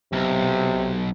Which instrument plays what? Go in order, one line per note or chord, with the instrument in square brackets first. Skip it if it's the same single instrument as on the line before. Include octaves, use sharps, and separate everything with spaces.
[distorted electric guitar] B1 [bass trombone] C3